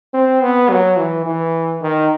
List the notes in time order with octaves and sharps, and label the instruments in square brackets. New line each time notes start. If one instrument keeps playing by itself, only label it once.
[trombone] C4
B3
F#3
E3
E3
D#3